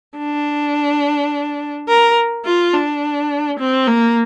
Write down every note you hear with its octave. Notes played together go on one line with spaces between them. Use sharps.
D4
A#4
F4
D4
C4
A#3